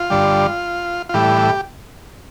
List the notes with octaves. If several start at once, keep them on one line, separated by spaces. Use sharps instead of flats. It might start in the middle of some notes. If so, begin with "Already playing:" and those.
Already playing: F4
G2 D3 G3
F4
A2 E3 G3 G4